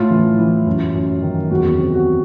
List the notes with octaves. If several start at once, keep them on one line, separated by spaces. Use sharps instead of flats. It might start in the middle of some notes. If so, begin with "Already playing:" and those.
Already playing: A2 F4
E3
E3
F#2
F#2
D#3
E2 F#4
C3
F#4